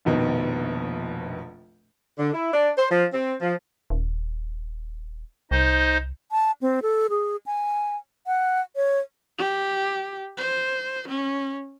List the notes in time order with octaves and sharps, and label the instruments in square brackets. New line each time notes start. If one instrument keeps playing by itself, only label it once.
[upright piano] F1 A#1 B2 D#3
[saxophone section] D3
E4
D4
C5
F3
C4
F3
[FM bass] D#1
[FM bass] C2 [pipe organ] D#4 C5 D#5
[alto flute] A5
C4
A4
G#4
G#5
F#5
C#5
[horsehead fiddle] G4
C5
C#4